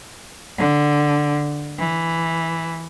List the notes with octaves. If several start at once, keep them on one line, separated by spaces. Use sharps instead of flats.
D3
E3